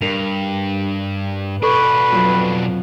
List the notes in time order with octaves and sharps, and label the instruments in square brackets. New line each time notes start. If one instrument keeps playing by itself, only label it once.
[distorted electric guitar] G2 [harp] A#4 [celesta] F7
[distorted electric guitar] B2 D4 [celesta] A4 C#6 [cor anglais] B4
[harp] F2 F#3